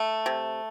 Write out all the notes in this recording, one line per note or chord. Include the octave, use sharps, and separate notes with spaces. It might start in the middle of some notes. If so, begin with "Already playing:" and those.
Already playing: A3
C3